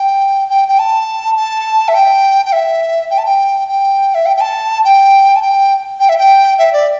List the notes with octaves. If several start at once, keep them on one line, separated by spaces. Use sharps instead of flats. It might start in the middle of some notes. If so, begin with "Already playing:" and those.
Already playing: G5
G5
G5
A5
A5
E5
G5
G5
E5
G5
A5
G5
G5
E5
G5
G5
A5
G5
A5
G5
G5
E5
G5
E5
D5